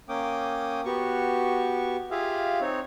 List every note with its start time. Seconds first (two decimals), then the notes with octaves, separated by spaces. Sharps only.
0.09 A#3 C#4 G5 D6 D#6
0.85 B3 F#4 G4 C#6
2.11 F4 G4 G#4 E5 F5
2.61 C4 D#4 C#5